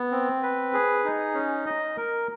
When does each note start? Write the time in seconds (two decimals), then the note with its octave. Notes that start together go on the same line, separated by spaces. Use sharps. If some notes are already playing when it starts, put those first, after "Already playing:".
Already playing: B3
0.11 C4
0.43 B4
0.73 G#4
1.05 D#4
1.34 C#4
1.66 D#5
1.97 A#4